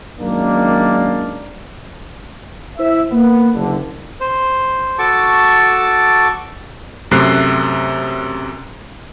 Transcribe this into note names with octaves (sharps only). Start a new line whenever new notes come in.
F#2 D#3 G#3 A#3 D4
E4 C5 E5
A#3 B3
F#1 D3
C5
F#4 A4 A5 C#6 D6
F#2 C3 A3 F#6 C7